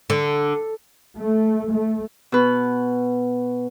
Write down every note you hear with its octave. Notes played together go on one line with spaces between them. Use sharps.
D3
A3
A3
B2 B4